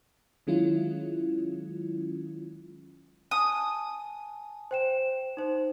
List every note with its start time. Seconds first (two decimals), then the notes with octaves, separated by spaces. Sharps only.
0.47 D#3 F#3 G#3 C#4 E4 F4
3.31 G#5 A5 D#6
4.71 C5 G5 E7
5.37 D#4 C5